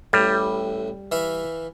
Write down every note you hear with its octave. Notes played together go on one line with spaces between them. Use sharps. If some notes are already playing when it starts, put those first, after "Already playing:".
A1 A2 G3
E3 E5 F5